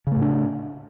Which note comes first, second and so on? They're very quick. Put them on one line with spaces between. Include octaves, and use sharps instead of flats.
C#3 A3 A2 D4